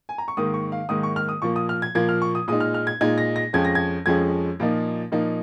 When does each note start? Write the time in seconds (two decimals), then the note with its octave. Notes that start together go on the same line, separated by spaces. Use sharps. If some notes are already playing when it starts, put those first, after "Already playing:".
0.09 G#5
0.18 A#5
0.28 C#6
0.37 G#2 D#3 A#3 D#6
0.54 C#6
0.72 F5
0.89 G#2 D#3 A#3 D#6
1.03 C#6
1.16 F6
1.29 D#6
1.42 A#2 F3 A#3 C#6
1.56 D#6
1.69 F6
1.82 G#6
1.95 A#2 F3 A#3 G#6
2.09 F6
2.22 C#6
2.35 D#6
2.48 A#2 G#3 D#4 D#6
2.60 F6
2.74 F6
2.87 G#6
3.01 A#2 G#3 D#4 G#6
3.18 A#6
3.36 A#6
3.53 F2 F3 G#3 C#4 G#6
3.65 A#6
3.75 G#6
4.06 F2 F3 G#3 C#4 G#6
4.60 A#2 F3 A#3 D#4
5.12 A#2 F3 A#3 D#4